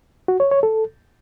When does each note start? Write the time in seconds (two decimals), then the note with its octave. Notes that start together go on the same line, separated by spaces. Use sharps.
0.28 F#4
0.40 C#5
0.51 C#5
0.63 A4